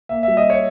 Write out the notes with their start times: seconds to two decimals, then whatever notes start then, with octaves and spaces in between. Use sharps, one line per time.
0.09 A#3 E5
0.23 E5
0.28 G3
0.37 D#5
0.50 C#5